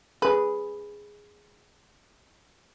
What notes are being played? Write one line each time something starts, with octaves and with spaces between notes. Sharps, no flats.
G#4 B4